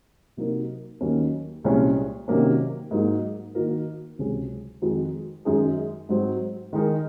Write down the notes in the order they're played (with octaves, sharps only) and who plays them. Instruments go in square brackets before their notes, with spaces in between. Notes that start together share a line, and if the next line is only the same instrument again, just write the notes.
[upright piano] C3 F#3 A#3 D#4 A#4
D#2 D#3 F#3 A#3 C#4
C2 A#2 G#3 C#4
C3 D#3 F#3 A#3 C#4
G#2 F#3 A#3 D#4
D#3 A#3 D#4 F#4 A#4
C#2 C3 F#3 C#4 G#4
F2 D#3 G#3 D#4 F#4
F#2 D#3 G#3 D#4 G#4
G#2 F#3 C4
D#3 G#3 D#4 A#4